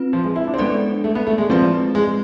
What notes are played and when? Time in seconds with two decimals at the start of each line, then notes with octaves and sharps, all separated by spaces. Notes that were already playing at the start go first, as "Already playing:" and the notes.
Already playing: C4 F4 B4
0.13 F3
0.24 G#3
0.36 E4
0.47 D4
0.54 C4
0.58 G#3 B3 D4 A4 D5
1.04 A3
1.15 B3
1.27 A3
1.38 G#3
1.49 F3 G#3 C4 E4 B4 D5
1.95 G#3